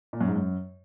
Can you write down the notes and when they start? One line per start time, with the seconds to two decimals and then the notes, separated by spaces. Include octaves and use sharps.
0.13 A#2
0.21 F#2
0.28 G#2
0.36 F#2